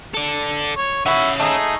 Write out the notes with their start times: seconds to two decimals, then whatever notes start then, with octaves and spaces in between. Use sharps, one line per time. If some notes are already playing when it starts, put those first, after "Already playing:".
0.14 A4 D5
0.77 C#5
1.06 C#4 E4 F#4 E5 B5
1.40 A3 D#4 G#4